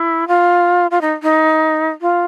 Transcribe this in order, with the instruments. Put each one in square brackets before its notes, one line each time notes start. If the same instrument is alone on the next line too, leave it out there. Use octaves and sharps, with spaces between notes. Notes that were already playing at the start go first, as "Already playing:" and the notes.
Already playing: [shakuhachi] E4
F4
F4
D#4
D#4
F4